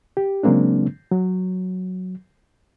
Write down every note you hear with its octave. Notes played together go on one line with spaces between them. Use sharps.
G4
C#3 F#3 G#3 A#3 C4 D4
F#3